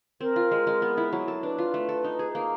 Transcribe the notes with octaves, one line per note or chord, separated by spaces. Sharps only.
C4 A#4
F4
G#3
G#3
B3
E4
F#3
A4
D4 B4
F4
A3
A4
D#4
G#4
A#3